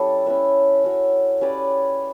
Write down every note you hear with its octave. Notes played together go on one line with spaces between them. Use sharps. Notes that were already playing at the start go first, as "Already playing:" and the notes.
Already playing: G3 C#4 E4 A4 C#5
C#4 E4 B4 E5
C#4 F#4 C#5
C#4 G4 B4 D5